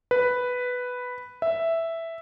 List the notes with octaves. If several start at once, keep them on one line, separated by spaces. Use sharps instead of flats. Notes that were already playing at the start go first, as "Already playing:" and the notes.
B4
E5